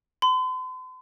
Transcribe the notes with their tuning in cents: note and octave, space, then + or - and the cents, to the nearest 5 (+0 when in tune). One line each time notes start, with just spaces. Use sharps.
C6 -45